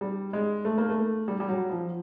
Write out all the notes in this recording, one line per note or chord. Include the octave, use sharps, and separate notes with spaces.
G3
G#3
A3
A#3
A3
G3
G3
F#3
F3